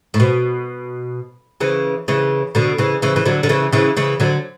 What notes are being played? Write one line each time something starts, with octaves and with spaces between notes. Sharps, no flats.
A2
B2
C#3 E3
C#3 E3
B2 D3
C#3 E3
C#3 E3
E3
D3 F#3
D3
C#3 E3
C#3 E3
C#3 E3
D3 F#3